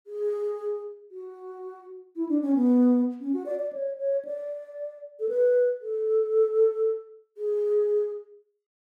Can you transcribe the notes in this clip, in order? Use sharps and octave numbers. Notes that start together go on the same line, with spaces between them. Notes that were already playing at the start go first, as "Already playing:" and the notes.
G#4
F#4
E4
D4
C#4
B3
C#4
F#4
D5
D5
C#5
C#5
D5
A4
B4
A4
G#4